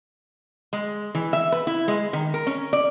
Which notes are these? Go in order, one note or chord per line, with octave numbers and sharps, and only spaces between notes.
G#3
E3
E5
B4
E4
G#3
D#3
A#4
C#4
D5